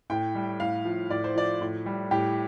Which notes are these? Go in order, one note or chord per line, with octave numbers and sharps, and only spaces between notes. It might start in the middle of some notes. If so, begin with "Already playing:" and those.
A2 G5
G3
A2 F5
F3
A2 D5
C5
F3 D5
A2
G3
A2 G4